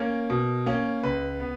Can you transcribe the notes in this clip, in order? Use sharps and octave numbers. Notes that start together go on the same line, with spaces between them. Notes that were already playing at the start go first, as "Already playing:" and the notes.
Already playing: A#3 C#4 A#4
B2
A#3 C#4
C#2 B4
B3